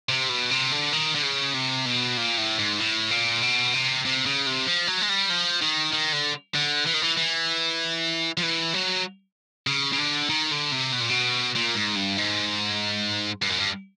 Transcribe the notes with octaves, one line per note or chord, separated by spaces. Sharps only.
C3
B2
C3
D3
D#3
D3
C#3
C3
B2
A#2
A2
G#2
A2
A#2
B2
C3
C3
C#3
C3
F3
F#3
G#3
G3
F3
D#3
D#3
D3
D3
E3
D#3
E3
E3
F3
E3
F#3
C#3
C#3
D3
D#3
D3
C3
B2
A#2
B2
A#2
G#2
G2
G#2
G2
F#2
G2